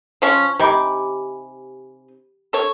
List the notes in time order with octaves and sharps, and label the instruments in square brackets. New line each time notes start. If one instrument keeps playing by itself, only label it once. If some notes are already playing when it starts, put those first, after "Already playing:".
[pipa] F3 C#4
[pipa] C3 D#4 G#5 [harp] G4 B5 D6
[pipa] A4 C#5